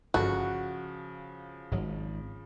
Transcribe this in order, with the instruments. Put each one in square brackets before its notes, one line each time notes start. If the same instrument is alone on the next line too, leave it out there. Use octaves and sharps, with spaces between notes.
[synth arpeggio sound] G1 A4 [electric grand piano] C#3 F3 F#6 [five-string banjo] F#4
[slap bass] G#1 [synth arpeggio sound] G#2 F#3